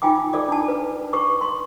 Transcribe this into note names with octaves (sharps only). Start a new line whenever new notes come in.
D#4 F4 G5 G#5 D6
G#4 A4 D5 D6
D4 A5
B4
G4 B4 C#6 D6
C6